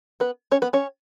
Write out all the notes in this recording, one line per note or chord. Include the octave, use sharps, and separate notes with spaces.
B3 B4
C#4 C#5
B3 B4
C#4 C#5